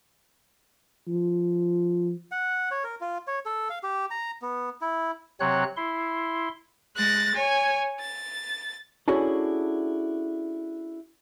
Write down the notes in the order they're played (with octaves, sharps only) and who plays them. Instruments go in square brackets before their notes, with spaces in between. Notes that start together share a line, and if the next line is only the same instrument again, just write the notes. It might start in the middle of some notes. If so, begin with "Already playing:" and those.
[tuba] F3
[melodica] F#5
C#5
A#4
F4
C#5
A4
F5
G4
A#5
B3
E4
[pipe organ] C3 F#3 C4 C#5 F#6
E4 C6
[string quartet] G#3 F#6 A6 A#6
C#5 G#5
A6
[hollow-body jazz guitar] C#4 D4 E4 F#4 G#4 A4